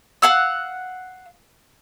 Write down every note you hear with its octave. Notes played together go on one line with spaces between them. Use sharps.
F5 F#5 E6